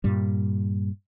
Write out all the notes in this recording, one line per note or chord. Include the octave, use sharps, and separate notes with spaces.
G2 A#2 G3